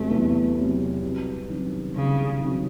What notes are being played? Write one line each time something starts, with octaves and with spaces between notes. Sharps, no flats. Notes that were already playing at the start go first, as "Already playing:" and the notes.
Already playing: E2 C3 F#3 A3
E2
C3 F#3
C2
C3 D#3 F#3 C#4
C2 C#3
C3 D#3 F#3 C#4